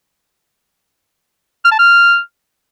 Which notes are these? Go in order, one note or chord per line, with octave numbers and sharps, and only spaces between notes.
F6
A5
F6